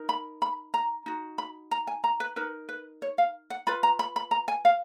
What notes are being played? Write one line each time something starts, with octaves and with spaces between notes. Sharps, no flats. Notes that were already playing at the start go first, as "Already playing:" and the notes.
Already playing: D#4 A#4
B5
B5
A#5
D#4 F#4
B5
A#5
G#5
A#5
B4
D#4 A#4 B4
B4
C#5
F5
F#5
F4 B4 B5
A#5
B5
B5
A#5
G#5
F5